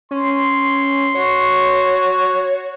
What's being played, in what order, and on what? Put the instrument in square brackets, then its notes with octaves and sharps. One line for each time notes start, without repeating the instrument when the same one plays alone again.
[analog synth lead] C#4 [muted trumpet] C6
[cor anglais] F#4 [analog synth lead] C#5